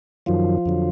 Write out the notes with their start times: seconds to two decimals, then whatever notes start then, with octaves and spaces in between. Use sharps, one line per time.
0.26 F#2 D#3 F3 F#3 F4
0.66 F2 D3 F#3